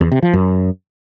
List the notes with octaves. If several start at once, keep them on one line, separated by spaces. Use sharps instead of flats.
E2
C3
F3
F#2